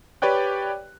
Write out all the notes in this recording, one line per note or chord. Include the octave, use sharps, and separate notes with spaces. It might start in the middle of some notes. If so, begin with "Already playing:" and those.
G4 B4 C#5 D5 G5 F#6